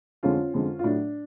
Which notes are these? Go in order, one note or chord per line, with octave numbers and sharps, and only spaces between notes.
F2 D3 G#3 C#4 F4
F2 D3 G#3
F4
A2 F#3 D4